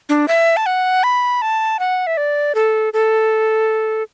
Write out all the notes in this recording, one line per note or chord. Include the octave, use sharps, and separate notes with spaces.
D4
E5
A5
F#5
B5
A5
F#5
E5
D5
A4
A4